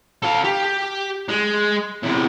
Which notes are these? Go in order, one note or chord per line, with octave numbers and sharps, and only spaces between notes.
A4 F5
G4
G#3
E2 C3